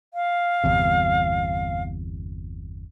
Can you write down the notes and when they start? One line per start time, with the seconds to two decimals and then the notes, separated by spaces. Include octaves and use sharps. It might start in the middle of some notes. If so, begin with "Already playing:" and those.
0.14 F5
0.64 G1 E2 C3